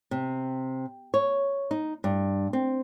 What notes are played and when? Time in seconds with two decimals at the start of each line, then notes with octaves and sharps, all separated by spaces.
0.11 C3
1.14 C#5
1.71 D#4
2.04 G2
2.53 C4